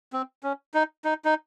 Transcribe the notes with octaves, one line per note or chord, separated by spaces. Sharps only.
C4
C#4
D#4
D#4
D#4